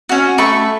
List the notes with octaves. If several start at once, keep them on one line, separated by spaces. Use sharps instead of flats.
C#4 F#4
A3 B5 C#6